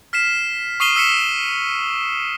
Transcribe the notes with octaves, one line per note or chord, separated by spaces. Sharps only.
F6 B6 C7 E7
C#6 D#6 C7 D#7 E7 G7
E6 B6 C#7 E7